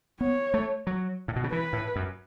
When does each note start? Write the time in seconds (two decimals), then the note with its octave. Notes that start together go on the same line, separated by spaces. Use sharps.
0.21 B3 C#5
0.54 A3
0.87 F#3
1.28 A2
1.36 B2
1.44 C#3
1.52 E3 B4
1.73 A2
1.96 F#2